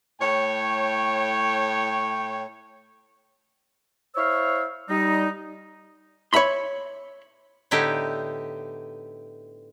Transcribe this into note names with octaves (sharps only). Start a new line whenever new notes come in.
A2 C#5 G5
E4 C5 C#5 F5 C#6 E6
G3 D#4
C#5 D#5 E5 B5 C6
A2 D3 B3 D#4 E4 G4